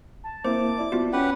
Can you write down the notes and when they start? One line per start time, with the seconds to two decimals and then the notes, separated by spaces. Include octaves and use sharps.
0.24 A5
0.45 A#3 C4 E4 C5 D6
0.79 E4 D5
0.92 B3 F4 F#4
1.13 C#4 G4 B4 F#5